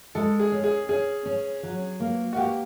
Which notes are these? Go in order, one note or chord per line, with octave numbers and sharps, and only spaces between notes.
G#3 A4
G#4
C#4
G#4
C#4 G#4
C#4
F#3
A#3
F#4
A#3 G4